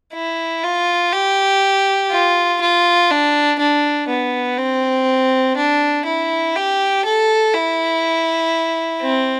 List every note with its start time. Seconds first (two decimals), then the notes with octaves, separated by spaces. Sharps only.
0.14 E4
0.64 F4
1.13 G4
2.11 F4
2.61 F4
3.10 D4
3.59 D4
4.08 B3
4.58 C4
5.57 D4
6.05 E4
6.55 G4
7.05 A4
7.54 E4
9.02 C4